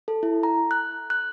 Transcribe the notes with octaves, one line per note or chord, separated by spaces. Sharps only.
A4
E4
A#5
F#6
F#6